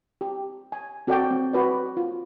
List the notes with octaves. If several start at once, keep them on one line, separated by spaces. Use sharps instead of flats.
G4
G#5
C4 F#4 A4 D5 F#5 G5
C4
F#4 B4 D5
F4